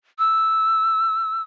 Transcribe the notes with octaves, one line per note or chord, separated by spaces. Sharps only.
E6